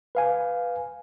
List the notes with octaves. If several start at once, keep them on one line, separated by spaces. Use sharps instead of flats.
B4 F5 G#5